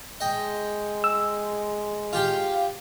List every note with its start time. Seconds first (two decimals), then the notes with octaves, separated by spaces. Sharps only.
0.20 G#3 D#5 G5
1.04 E6
2.13 F4 G4 F5 G5